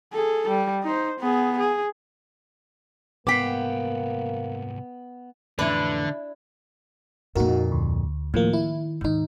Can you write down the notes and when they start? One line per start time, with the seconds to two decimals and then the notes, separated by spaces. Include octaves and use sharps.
0.13 G#4 A4
0.48 G3
0.83 D#4 C5
1.19 B3 G#4
1.58 G#4
3.27 C2 G#2 A#3 B3 G5 D6 B6 C7
5.59 F2 A2 D3 E3 D4 E4 B4
7.35 F2 A#2 D#4 F#4 A#4
7.72 D2
8.34 A2 D#3 F3 A#3
8.53 E4
9.01 D#2 G#2 D#3 D#4